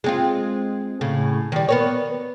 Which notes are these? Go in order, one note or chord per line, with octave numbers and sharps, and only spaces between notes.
G#3 C4 F4
A2 C#3
D#3 G3
B3 A#4 C#5